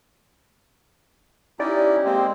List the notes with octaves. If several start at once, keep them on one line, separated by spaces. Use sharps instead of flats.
C#4 D#4 E4 G4 D5
G#3 A#3 C4